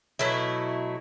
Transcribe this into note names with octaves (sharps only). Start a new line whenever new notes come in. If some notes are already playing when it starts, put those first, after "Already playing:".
B2 F#3 A3 E4